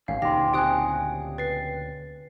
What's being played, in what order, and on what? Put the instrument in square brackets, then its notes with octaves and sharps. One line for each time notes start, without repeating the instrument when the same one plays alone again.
[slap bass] G#1 [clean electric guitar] D2 C#4 [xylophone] F5
[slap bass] D2 A#2 C#3 [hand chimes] D#4 C6 [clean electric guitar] G4 [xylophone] A#6
[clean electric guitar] C4 [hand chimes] G4 G#5 [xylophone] G5 D#6 F#6
[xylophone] B4 [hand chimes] A6 C7